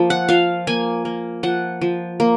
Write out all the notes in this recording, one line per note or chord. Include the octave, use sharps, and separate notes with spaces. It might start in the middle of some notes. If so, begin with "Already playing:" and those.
Already playing: F3 A#3
F#5
F3 F5
A#3 G#5
A#3
F3 F#5
F3
A#3